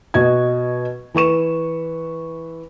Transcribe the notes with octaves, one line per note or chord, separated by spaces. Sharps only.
B2 F#4 D#5 G#6
E3 B4 C#6 E7